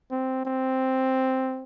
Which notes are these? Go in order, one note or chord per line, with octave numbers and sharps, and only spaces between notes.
C4
C4